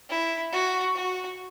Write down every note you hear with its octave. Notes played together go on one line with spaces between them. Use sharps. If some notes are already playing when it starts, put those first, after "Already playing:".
E4
F#4
F#4